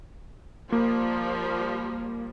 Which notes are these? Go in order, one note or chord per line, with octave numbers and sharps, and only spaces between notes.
F3 G3 A#3